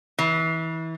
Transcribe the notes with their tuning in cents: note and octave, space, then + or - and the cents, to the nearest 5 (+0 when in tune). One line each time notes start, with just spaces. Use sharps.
E3 -30